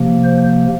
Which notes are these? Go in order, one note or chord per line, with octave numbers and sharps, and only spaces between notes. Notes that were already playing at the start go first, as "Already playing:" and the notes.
Already playing: C3 F3 A#3
C5